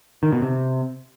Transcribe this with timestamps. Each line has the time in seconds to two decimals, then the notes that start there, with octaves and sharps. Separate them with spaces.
0.23 D#3
0.33 B2
0.42 C3